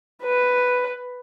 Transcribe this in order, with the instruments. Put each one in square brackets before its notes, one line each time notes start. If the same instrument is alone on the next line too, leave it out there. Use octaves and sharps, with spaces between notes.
[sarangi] B4